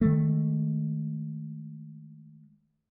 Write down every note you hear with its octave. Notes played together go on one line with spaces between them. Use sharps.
D#3 G#3 A3